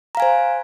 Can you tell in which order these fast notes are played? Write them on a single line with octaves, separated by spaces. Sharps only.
A#5 F5 G#5 C5